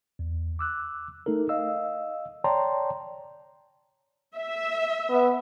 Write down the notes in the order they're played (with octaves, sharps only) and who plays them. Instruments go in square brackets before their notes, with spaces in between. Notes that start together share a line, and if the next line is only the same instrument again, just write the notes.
[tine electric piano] E2
D6 E6 F#6
A3 D#4 A4 A#4
D#5 F5 E6
C#5 D5 G5 A5 A#5 C6
[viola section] E5
[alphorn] B3